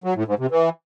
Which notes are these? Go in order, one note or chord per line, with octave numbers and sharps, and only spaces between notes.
F#3
A2
G#2
C3
E3